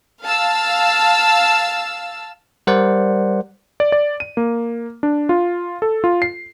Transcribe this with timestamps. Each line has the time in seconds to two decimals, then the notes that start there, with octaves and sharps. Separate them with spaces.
0.24 F5 A5 E6
2.67 G3 A#4 C5 D5 F#5
3.80 D5
3.92 D5
4.20 D#7
4.37 A#3
5.03 D4
5.29 F4
5.82 A4
6.04 F4
6.22 C7